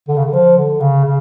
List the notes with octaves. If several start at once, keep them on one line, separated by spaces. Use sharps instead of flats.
D3
C#3
D3
F3
D3
C#3
C#3